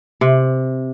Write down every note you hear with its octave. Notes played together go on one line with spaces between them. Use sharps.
C3